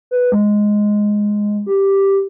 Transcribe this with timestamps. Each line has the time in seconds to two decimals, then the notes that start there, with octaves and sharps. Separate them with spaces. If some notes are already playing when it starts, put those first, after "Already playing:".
0.11 B4
0.32 G#3
1.66 G4